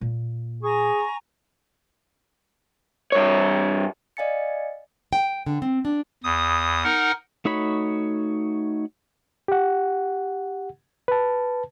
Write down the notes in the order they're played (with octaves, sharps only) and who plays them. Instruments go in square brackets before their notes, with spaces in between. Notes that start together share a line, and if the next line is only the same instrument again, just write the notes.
[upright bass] A#2 A#3
[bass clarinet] G#4 [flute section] G#5 A#5 C#6
[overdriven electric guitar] G2 C#5
[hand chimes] D5 D#5 F5 G#5 A6 C#7
[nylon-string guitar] G5
D3
C4
D4
[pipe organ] E2 D#6
D#4 A#4 F#5
[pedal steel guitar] A3 D#4 F#4 C#5 B5
[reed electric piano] G4 F#5
B4 A5